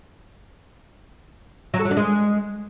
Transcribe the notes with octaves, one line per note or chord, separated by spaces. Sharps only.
F#3
A4
F#3
D4
G#3